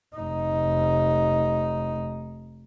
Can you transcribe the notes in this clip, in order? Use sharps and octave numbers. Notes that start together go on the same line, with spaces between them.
F1 D#4